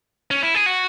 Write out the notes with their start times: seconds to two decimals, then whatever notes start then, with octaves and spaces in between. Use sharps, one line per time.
0.31 C#4
0.43 E4
0.55 G#4
0.66 F#4